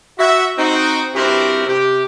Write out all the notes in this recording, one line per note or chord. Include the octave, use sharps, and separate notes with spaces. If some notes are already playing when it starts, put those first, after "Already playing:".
F#4 E5
C4 D#4 F#4
G2 C4 E4 F#4 G4 A#4
C3 G4